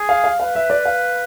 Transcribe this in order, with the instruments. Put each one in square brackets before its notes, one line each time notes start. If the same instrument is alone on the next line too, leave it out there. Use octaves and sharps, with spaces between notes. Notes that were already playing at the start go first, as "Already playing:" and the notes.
Already playing: [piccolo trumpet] G#4
[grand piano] F5
F5
[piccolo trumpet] B4 [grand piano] F5
[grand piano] E5
D5
F5